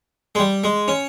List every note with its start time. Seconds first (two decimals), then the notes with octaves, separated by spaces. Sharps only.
0.35 G#3
0.39 G3
0.64 G#3
0.88 C#4